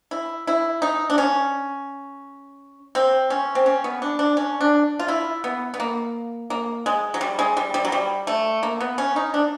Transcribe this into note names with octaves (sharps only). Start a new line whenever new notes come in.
E4
E4
D#4
D4
C#4
C4
C#4
C4
C#4
B3
D4
D4
C#4
D4
F4
E4
B3
B3
A#3
A#3
G#3
F#3
G3
G#3
G3
G3
F#3
G3
A3
A#3
B3
C#4
D#4
D4